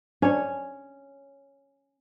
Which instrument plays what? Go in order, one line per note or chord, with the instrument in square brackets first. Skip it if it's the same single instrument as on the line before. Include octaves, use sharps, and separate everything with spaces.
[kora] C#4 C#5 [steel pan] D4